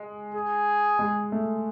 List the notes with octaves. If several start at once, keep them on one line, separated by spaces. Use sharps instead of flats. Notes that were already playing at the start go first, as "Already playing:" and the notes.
Already playing: G#3
G#4
G#3
A3